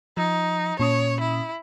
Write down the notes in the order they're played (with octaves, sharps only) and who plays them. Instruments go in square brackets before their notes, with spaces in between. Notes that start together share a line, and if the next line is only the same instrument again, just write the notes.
[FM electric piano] F3 [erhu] D#4
[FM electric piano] A#2 C#4 D#6 [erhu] C#5
[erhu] E4